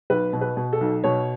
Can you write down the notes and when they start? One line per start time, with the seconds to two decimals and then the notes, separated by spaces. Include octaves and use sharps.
0.10 B1 B4
0.33 B2
0.41 B4
0.57 B2
0.73 A4
0.81 B1
1.04 B2 C#5